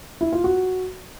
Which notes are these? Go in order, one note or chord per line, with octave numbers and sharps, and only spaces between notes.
E4
F4
F#4